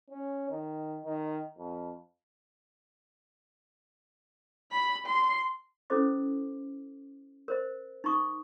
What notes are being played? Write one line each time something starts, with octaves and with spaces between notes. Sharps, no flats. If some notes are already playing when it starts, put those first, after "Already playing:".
C#4
D#3
D#3
F2
B5
C6
C#4 E4 A4 C5 D#5 D6
A#4 C5 D#5
D#4 A#5 C#6 D#6